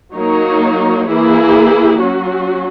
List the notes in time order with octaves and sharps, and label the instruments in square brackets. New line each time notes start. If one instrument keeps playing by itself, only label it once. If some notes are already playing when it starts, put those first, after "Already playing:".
[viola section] F#3 A#3 D#4 A#4 C#5
E3 A#3 E4 G#4
F#3 C#4 F#4